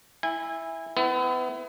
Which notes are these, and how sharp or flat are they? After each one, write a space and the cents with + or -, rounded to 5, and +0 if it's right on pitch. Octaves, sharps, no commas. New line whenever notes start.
E4 +0 G#5 -25
B3 +35 E4 +0